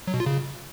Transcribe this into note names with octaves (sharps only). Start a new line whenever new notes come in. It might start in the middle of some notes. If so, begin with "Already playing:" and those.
F#3
B2
F4
C#3